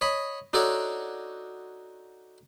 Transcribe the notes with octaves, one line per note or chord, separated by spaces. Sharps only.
C#5 D#5 B5
D4 D#4 F#4 A4 C#5 D5